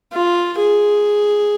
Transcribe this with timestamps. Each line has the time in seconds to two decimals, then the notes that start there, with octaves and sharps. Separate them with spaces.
0.13 F4
0.59 G#4